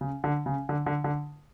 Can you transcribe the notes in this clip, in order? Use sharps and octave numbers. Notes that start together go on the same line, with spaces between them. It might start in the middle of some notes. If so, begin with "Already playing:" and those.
C#3
D3
C#3
D3
D3
D3